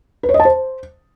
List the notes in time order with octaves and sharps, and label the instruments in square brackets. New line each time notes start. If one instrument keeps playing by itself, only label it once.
[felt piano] B4
C#5
D#5
A5
C5